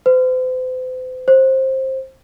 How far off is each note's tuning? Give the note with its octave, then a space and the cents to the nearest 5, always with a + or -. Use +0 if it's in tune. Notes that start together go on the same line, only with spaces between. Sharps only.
C5 -40
C5 +20